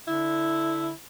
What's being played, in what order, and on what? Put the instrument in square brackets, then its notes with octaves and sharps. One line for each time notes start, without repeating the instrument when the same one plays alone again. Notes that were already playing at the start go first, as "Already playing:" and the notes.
[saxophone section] D3 E4